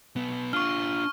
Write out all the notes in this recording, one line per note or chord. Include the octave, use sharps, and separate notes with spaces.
B1 B3
D4 F4 C#6 F6